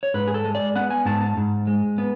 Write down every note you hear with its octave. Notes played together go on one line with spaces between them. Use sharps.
C#5
G#2 B4
G#4
A4
G#3
D5
B3 F#5
G#5
G#2 A5
A5
G#2
G#3
B3